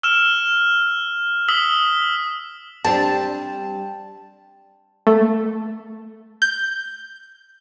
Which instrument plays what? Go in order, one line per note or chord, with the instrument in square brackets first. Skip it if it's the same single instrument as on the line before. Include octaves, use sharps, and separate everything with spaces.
[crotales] E6 F6 E7
D#6 E6 B6 F#7
[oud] G3 C4 D4 [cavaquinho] A5
[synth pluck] A3
G6